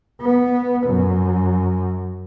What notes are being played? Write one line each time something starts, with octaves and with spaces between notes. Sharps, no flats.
B3
F#2